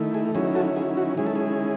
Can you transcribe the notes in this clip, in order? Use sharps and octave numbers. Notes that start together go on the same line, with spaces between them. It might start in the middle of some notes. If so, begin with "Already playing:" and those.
Already playing: D#3 A3 E4
G#4
D#3 F#3 C#4 E4 G#4
F#4 A4
G#4
F#4
D#3 G#3 C#4 E4 G#4
A4
G#4